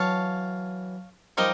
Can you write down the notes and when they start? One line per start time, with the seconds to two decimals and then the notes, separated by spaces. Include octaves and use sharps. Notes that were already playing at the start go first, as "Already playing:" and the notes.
Already playing: E3 F#3 C#5 F5 A5
1.37 F3 G3 D#4 G4 A#4 D#5